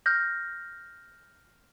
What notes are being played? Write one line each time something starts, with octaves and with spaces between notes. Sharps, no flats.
F6 G6 A#6